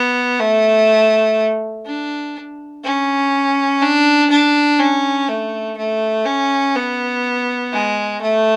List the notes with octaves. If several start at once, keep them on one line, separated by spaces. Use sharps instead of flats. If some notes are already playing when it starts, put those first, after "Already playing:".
Already playing: B3
A3
D4
C#4
D4
D4
C#4
A3
A3
C#4
B3
G#3
A3